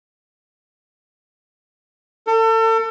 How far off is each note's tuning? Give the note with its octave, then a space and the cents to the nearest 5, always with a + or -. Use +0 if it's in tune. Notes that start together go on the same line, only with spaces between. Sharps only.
A4 +35